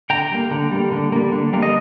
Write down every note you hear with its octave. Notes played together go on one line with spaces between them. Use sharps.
D3 G5 A#5
G3 A#3
D3
G3 A#3
D3
G3 A#3
D3
G3 A#3
D#5